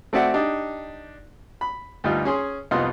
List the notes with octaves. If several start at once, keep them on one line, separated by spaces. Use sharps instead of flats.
A3 C4 F#4 D5 E5 F#5
D4 D#4 G4
B5
D2 G2 G3 D#4 F4
C#4 G#4 C6
C2 F2 B3 D#4 F4 C6